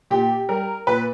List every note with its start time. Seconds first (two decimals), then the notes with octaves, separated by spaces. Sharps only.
0.11 A#2 G4
0.49 G3 A#4
0.87 A#2 B4